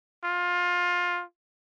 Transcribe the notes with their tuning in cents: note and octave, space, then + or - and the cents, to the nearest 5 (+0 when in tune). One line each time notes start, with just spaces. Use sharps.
F4 +20